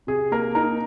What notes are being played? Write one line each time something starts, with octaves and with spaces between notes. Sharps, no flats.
C3 G#4
A#3 A#4
D#4 A#4